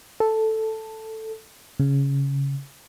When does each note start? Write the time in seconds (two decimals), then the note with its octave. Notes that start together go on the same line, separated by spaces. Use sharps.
0.20 A4
1.79 C#3